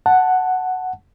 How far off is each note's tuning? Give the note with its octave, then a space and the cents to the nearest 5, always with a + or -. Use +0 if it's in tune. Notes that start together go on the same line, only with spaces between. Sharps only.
F#5 +0 A5 +0